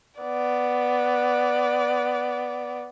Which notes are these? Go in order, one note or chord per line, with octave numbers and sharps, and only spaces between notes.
B3 D5